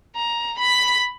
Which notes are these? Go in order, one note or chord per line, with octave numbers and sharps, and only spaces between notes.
A#5
B5 B6